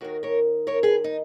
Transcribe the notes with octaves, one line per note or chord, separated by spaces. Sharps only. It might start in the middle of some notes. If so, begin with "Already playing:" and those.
D#2 D#3 F#4 A#4
A#4 C#5
A#4 C#5
G#4 B4
D#4